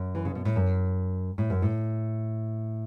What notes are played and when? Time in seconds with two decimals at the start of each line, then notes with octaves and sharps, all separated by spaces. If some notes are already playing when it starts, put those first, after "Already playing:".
Already playing: F#2
0.15 E3
0.25 C#3
0.35 B2
0.45 A2
0.56 F#2
1.38 A2
1.50 F#2
1.62 A2